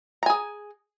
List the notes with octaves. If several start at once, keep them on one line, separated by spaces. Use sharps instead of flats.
G#4 G#5 A#5